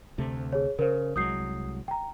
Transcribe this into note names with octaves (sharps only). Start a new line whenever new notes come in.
D2 C3 A3
G#4 C#5
C#3 A#4 C5
C2 F#3 G#3 D#6 G6 C7
G5 A#5